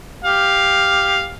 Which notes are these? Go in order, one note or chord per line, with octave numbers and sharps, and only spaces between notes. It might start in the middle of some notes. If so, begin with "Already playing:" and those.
G4 F5